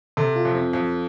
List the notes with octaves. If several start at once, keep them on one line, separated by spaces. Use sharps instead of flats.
C3 A4
F4
F2
C4
F2